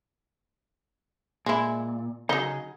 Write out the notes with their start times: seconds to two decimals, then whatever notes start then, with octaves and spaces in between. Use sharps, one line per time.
1.46 A#2 G#3 E4
2.29 C#3 F#3 D#4 G#4